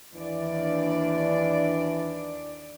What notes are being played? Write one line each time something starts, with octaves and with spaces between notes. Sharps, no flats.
D#2 E3 D4 D5